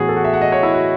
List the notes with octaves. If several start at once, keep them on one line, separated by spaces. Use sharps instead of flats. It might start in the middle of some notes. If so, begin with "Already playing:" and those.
Already playing: A2 E3 B3 F#4 G#4
A4
F#4
E5
F#5
D#5
C#5
E4
F#4